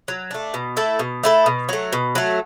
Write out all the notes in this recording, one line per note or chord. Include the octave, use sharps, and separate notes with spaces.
F#3
A3 D4
B2
A3 E4 A4
B2
A3 E4 A4
B2
F#3 A3
B2
F#3 A3